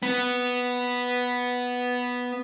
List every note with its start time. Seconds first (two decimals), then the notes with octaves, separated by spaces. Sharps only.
0.03 B3